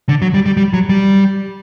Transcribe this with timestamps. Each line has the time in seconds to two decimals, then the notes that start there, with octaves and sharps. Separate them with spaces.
0.09 D3
0.22 F#3
0.34 G3
0.46 G3
0.57 G3
0.73 F#3
0.89 G3